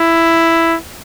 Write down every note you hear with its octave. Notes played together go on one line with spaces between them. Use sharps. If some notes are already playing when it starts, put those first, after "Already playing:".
Already playing: E4